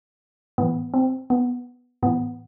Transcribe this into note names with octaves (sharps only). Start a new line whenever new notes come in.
A2 E3 B3
C4
B3
A2 E3 B3